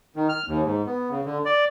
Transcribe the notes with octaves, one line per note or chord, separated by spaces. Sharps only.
D#3
F6
D#2
G#2
B3
C#3
D3
D5